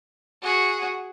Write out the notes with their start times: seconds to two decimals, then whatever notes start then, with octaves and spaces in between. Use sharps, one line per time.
0.43 F#4 G#4